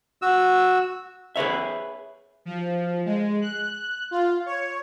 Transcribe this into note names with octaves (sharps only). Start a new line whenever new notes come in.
F#4 E6
G#4 B4 C#5 E5
F3
G#3
F#6
F4
C#5